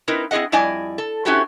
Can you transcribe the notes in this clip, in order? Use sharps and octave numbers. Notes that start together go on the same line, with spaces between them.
C4 D#4 E4 A#4 B4
C4 E4 G#4 D#5 F#5
F2 G3 E4 D5 D#5 G#5
A4
C#4 E4 F#4 G4 A4 C5